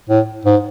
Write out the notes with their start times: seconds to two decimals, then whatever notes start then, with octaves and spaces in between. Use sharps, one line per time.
0.09 A2
0.45 G#2